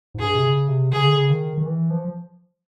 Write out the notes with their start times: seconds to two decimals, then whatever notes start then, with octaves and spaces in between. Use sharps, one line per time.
0.14 G#2
0.19 G2 G#4
0.34 C3
0.45 C#3
0.68 C3
0.92 C#3 G#4
1.04 D3
1.14 C#3
1.30 D#3
1.58 D#3
1.66 E3
1.90 F3